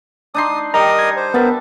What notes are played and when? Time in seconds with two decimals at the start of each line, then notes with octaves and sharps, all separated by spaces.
0.34 D4 D#4 C6 D#6
0.74 G3 A#4 D#5 A#5 D#6
0.99 G#6
1.16 C5
1.34 B3 A#4 B4 E5 A5